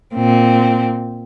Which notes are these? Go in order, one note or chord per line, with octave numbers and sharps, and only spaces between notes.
A#2 C4